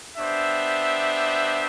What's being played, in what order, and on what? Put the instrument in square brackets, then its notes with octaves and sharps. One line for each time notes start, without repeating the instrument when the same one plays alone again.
[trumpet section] B3 D4 G4 C5 E5